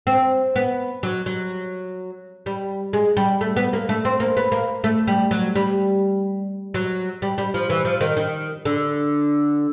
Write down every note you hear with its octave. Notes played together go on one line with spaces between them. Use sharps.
C4
B3
F#3
F#3
G3
G#3
G3
A3
B3
A#3
A3
C4
A#3
B3
A#3
A3
G3
F#3
G3
F#3
G3
G3
F3
E3
F3
D#3
D#3
D3